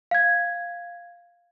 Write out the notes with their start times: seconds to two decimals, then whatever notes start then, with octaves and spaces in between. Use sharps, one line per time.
0.11 F5 G#6